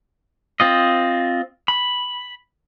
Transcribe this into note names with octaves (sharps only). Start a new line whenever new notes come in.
C4 F4 D#5
B5